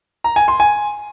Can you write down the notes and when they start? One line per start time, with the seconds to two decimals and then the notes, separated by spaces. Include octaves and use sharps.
0.24 A#5
0.36 G#5
0.48 C6
0.60 G#5